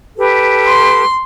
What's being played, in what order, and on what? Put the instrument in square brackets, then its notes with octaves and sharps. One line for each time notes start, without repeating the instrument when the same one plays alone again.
[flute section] G4 A4 B4
[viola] C6